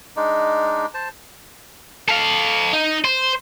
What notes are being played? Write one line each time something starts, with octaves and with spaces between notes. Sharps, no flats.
G#3 D4 D#4
C5 A5
A4 F5
D#4
C5